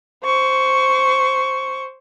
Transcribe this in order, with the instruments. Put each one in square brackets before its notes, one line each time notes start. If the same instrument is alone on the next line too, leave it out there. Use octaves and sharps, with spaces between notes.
[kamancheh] C5 C#6